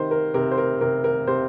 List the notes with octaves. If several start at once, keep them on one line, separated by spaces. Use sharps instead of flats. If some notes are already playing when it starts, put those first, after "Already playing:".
Already playing: C3 D#3 C5
A#4
C3 A#4
C5
A#4
C3 A#4
A#4
C3 C5